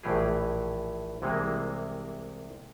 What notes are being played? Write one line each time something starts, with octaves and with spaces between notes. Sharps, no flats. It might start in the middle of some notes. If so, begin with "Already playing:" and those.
A#1 A2 E3 G4 G#4
C2 C3 E3 G#3 A#3